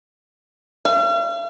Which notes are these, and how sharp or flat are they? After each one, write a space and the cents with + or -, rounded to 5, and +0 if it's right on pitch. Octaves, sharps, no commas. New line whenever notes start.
F5 -45